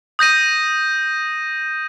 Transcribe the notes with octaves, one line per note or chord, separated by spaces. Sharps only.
D#6 G6 A#6 D#7